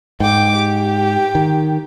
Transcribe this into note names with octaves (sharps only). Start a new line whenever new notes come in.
G#2 G5 D6
G4
D#3